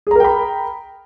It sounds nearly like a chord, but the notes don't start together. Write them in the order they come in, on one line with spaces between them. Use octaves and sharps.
G#4 A#5 A#4 G5 B5